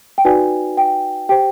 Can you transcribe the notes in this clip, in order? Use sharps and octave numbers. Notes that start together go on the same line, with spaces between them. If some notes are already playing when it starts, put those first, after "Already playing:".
G5
D#4 F#4 B4 D5 G#5
G5
G4 C5 G5